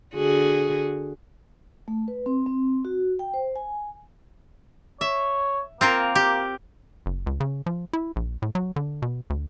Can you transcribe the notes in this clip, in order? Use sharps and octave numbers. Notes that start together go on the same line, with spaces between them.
D3 F#4 G#4
A3
B4
C4
C4
F#4
G5
C5
G#5
C#5 E5
A#3 C4 F4 A#4
G4
F#1
C#2
C#3
F3
E4
A#1
A2
F#3
D3
B2
D2